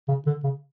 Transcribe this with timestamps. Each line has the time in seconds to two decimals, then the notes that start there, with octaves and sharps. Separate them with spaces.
0.08 C#3
0.27 D3
0.44 C#3